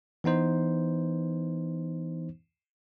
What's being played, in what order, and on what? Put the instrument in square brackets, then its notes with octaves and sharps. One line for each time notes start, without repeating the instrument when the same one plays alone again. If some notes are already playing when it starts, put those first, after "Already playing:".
[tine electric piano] E3 B3 D#4 C5